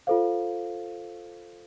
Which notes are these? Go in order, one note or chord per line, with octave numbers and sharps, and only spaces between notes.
F4 A4 C5 F5